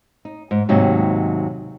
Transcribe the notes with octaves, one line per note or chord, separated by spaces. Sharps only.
D#4
G#2
D#2 G#2 C3 F#3 D#4